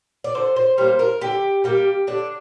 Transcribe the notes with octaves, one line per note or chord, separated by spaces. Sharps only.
D5
D3 C5
C5
G3 A#3 C5
A#4
D3 G4
G3 A#3 G4
D3 D4